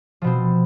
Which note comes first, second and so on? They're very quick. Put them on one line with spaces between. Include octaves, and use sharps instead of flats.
F3 B2 C4